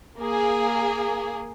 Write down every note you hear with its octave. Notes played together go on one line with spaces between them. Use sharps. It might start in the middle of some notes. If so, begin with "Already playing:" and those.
A#3 G#4